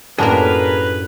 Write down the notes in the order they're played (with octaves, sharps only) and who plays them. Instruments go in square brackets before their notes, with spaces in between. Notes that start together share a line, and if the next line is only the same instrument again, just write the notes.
[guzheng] F#2 A2 A#3 [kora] D4 G4 [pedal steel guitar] G#4 A#4 [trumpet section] B4